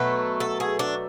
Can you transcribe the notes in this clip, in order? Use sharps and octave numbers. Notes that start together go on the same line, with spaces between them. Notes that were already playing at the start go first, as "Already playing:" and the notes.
Already playing: B2 F#3 A3 B4
A4
G#4
D4